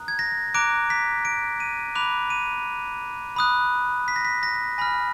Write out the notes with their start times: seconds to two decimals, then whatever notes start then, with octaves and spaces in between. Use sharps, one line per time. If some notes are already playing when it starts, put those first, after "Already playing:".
Already playing: A#5 D#6 F#6
0.08 G#6
0.19 A#6
0.54 A#5 D6 F#6 D7
0.90 B6
1.25 D7
1.60 D#7
1.95 B5 D6 F#6 F7
2.30 D#7
3.36 B5 D#6 F#6
4.08 B6
4.16 A#6
4.25 B6
4.43 A#6
4.78 G#5 B5 F6 A#6